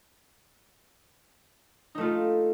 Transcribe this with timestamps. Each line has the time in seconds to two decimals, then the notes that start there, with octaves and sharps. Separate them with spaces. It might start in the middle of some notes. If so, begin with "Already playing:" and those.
1.95 D#4
1.98 A3
2.01 F4